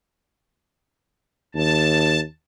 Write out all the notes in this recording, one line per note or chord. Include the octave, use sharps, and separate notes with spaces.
D#2 A5